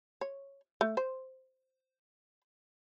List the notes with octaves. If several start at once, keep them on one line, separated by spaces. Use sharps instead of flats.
C#5
A3
C5